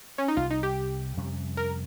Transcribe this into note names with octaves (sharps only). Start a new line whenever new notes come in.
C#4
D#4
C2 C3 G3 F4
D#4
G4
F2 C3 G3 C#4
A#4